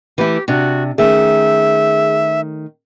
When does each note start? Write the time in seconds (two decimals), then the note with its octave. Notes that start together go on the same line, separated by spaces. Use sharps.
0.18 E3 A3 E4 G4
0.48 C3 D4 F#4
0.98 D#3 A3 C#4 G#4 E5